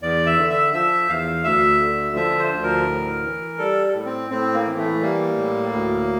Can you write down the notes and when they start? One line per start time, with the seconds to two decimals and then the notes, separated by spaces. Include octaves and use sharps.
0.01 E2 D5
0.26 E5
0.38 D3
0.50 E5
0.73 F3 E5
1.09 E2 F5
1.44 D2 E5
1.80 D3
2.15 F3 E5
2.39 C5
2.52 D2
2.63 A#4
2.87 A2
3.24 E3
3.58 G3 A4
3.94 A2
4.06 C4
4.31 A2 C4
4.54 A#3
4.66 E3
4.78 A3
5.01 G3 A#3
5.37 A2
5.73 D2